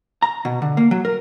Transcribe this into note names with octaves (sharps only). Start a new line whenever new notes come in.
A#5
B2
D3
A#3
F#3
A#4